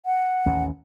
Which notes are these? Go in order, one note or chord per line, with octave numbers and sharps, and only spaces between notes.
F#5
A1 D#2 C#4